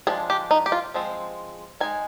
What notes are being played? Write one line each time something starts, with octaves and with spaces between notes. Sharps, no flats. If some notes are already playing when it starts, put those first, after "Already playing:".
F3 G#3 D4 G#4
G4
D#4
G4
F4
F3 G#3 C4
G#3 D#4 G#5